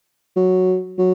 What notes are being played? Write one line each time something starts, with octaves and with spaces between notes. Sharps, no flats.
F#3
F#3